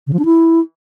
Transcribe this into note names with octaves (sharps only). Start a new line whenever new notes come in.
C#3
F3
D4
E4